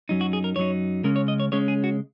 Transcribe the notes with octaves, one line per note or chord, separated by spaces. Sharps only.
F#2 F#3 D#4
F#4
G#4
A#4
F#2 F#3 D#4 C#5
C#3 G#3 C#4 A#4
C#5
D#5
C#5
C#3 G#3 C#4 C#5
G#4
F#4